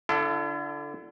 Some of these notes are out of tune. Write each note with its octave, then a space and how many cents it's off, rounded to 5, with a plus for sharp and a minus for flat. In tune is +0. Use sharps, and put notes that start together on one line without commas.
D3 +0 E4 +45 A4 +0